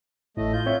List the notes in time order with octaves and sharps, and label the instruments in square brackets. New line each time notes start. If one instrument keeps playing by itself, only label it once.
[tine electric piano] A1 A2 [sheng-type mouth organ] A3 D#5
[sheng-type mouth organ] F4 G6
[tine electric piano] C4 C#5 E5